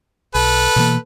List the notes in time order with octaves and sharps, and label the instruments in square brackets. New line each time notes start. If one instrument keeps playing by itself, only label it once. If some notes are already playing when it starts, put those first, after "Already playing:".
[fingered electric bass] B1 [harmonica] A4 B4
[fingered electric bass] B2 E3 A#3